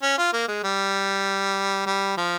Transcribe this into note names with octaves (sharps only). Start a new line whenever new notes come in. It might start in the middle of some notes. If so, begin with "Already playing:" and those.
C#4
F4
A#3
G#3
G3
G3
F3